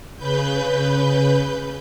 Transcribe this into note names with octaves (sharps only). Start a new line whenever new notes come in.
C#3 B4 G6